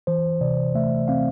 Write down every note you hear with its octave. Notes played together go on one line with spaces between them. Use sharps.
E3 C5
C3 D5
A3 E5
C4 F5